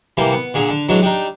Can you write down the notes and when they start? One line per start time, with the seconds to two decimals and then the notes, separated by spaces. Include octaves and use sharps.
0.17 C3 E3 G3 A#3
0.32 B3
0.54 A#2 D3 G#4
0.70 D3
0.89 E3 F#3 G#3 D4
1.02 G3 D4 D#4